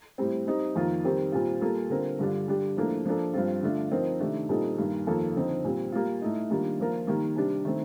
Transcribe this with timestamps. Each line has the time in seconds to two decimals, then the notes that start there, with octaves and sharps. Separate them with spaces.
0.18 A2 G3 C4
0.47 G3 C4 D#4
0.76 F2 D#3 A#3 F4
1.04 D#3 G3 C4 G4 A#4
1.32 A#2 G3 C4 F4
1.61 G3 A#3 F4 A4
1.90 D3 G3 C4 F4 A#4
2.19 G2 D3 G3 D4 F4
2.48 D3 G3 D4 G4
2.77 A2 F3 A#3 D4 A4
3.05 F3 A#3 D4 A4
3.34 G2 F3 C4 F4
3.63 D3 A3 D4 F4
3.92 F3 C4 D#4 A#4
4.20 C3 D#3 A3 D4
4.49 A#2 G3 C4 D#4 A4
4.78 G2 D#3 A#3
5.07 F2 D#3 A#3 F4 A4
5.36 D3 F3 C4 D#4
5.64 A#2 G3 C4
5.92 G3 A#3 F4
6.22 A2 A3 D#4
6.50 D#3 G3 A#3 D4 F4
6.80 F3 A#3 F4 A#4
7.07 D#3 G3 A#3
7.36 C3 G3 D4
7.65 D#3 A3 C4